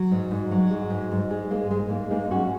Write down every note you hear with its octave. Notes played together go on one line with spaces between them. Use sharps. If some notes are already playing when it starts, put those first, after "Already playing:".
Already playing: F#3
G#2
G#2
F#3
G#3
G#2
G#2
G#3
G#3 A#3
G#2 G#3
G#2 A#3
G#3 A#3 D#4
D#4
F#3 C#4 F#4